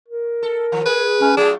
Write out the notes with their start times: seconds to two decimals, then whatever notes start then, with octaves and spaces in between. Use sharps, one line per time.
0.09 A#4
0.43 A4
0.72 D#3 F3
0.86 G#4 B4
1.20 G#3 C#4
1.37 F#3 A3 D4 F4 G#4